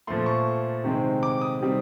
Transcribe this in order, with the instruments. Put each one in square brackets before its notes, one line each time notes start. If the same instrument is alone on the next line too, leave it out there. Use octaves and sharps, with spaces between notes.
[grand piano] A#2 F3 A3 C6
C#6
C3 D#3 G#3 C4
D6
D#6
C3 D#3 G3 C4